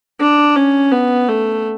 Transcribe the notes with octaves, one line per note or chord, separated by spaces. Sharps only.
D4
C#4
B3
A3